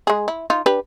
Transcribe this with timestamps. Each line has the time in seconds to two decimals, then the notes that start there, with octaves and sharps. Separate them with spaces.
0.07 G#3 G#4
0.28 E4
0.50 D#4 F4
0.66 D4 G4 B4